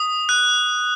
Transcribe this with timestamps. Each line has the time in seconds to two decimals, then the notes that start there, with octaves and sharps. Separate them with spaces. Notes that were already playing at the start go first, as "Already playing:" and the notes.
Already playing: D#6
0.29 F#6